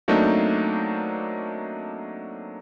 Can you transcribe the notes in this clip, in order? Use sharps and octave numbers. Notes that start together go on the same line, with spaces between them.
F#3 A3 A#3 C4 D4 D#4